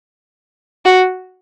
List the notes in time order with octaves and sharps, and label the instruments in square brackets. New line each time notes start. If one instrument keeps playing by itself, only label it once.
[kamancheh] F#4